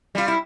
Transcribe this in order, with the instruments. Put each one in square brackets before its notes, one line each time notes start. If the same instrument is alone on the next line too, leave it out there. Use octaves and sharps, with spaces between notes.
[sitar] G3 [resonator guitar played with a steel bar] F4
[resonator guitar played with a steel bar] E4